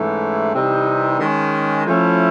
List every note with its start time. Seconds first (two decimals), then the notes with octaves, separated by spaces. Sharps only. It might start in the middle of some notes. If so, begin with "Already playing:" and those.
Already playing: G#2 E3 A3 C#4
0.53 C3 E3 G3 C4 D#4
1.19 D#3 G#3 C#4
1.85 F3 A3 C#4 E4